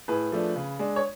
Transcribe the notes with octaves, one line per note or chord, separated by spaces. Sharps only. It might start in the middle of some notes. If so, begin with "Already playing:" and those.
A2 G#4 B4
F3 A3 D4
C#3
G#3 D4
C#5